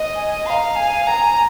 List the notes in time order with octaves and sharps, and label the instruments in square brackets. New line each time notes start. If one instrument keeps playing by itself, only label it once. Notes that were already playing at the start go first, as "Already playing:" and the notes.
Already playing: [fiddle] D#5
[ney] G#5
[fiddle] F5 [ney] C6
[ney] A#5
G#5
[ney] G#5 [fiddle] A#5